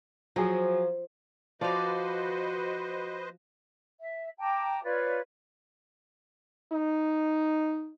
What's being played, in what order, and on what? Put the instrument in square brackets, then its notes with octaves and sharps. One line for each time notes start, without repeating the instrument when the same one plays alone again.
[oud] F3 [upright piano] F#3 G#4
[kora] F3 [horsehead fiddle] F#4 [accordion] B4 C5 D#5 [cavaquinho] D5 F5
[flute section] E5
G5 A5 A#5 D6
F4 B4 C#5 D5
[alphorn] D#4